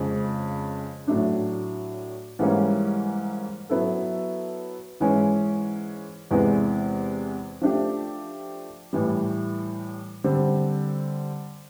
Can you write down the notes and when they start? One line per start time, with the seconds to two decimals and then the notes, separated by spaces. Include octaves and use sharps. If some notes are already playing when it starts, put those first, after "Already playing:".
Already playing: F2 C#3 F3 G#3 C4
1.07 A2 F#3 A3 D4
2.39 G#2 E3 G3 A#3 C#4
3.70 F#3 B3 E4 A4
5.00 G#2 E3 G#3 C#4
6.31 E2 C3 E3 G#3
7.62 F3 A3 D4 G4
8.93 A2 E3 G3
10.24 D3 G3 C4